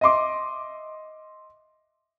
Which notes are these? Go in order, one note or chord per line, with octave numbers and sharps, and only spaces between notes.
D#5 E5 C6 D6